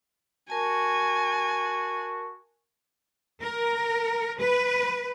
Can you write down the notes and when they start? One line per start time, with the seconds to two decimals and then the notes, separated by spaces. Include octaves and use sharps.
0.50 F#4 A#4 G#5 A5
3.42 A#4
4.38 B4